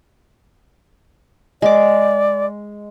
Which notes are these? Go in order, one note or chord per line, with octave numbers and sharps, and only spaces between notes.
G#3 D5 D6